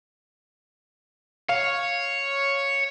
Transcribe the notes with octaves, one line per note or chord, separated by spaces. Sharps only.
C#5 F5